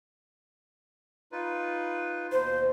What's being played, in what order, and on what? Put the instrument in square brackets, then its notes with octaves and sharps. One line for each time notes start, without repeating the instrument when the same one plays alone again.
[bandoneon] D#4 F4 B4
[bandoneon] D#2 B2 [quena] C5